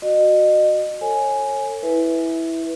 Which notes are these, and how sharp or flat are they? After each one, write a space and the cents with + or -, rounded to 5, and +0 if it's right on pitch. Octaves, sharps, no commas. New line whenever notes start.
F#4 -5 D#5 -30
A4 +35 C#5 -25 G#5 +5
E4 -5 B4 +0 E5 -10